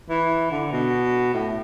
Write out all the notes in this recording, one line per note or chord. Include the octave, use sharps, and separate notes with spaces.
E3
D3
B2
A2